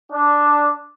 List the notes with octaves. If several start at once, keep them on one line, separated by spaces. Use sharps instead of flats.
D4